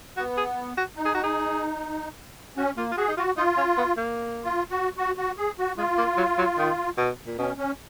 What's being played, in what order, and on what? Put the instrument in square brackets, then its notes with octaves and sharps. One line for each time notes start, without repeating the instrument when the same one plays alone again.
[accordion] B3 [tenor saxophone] F#4
[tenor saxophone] G#4
F#4
[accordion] D#4
[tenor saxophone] G#4
F#4
G#4
[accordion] C#4 [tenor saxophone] F#4
[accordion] A#3 [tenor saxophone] F4
[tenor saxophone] F4
[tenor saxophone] F#4 [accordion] G#4
[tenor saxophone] D#4
[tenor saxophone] F4 [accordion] F#4
[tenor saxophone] D#4 [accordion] F4
[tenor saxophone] C#4
B3
A#3
[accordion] F4
F#4
F#4
F#4
G#4
F#4
[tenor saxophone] G#3 [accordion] F4
[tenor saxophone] A#3
F#3
F#3
D#3
B2
A#2
[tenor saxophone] B2 [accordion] C#4
[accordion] C#4